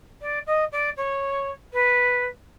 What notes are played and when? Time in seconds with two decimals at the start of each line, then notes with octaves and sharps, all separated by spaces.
0.21 D5
0.47 D#5
0.72 D5
0.97 C#5
1.73 B4